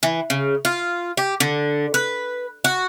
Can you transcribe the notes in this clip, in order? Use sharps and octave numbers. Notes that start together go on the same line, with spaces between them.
E3
C#3
F4
G4
D3
B4
F#4